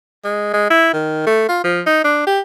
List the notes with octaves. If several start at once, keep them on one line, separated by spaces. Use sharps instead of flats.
G#3
G#3
E4
D#3
A3
F4
F3
D#4
D4
G4